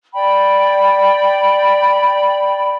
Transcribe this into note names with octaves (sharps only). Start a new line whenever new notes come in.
D5 G5 B5